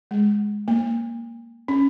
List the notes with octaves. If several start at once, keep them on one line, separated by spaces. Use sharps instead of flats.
G#3
A#3
C#4